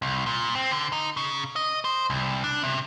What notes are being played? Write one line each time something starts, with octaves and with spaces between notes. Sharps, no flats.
C2
A#2
C4
D3
D#4
C#3
D#5
C5
C2
D4
C3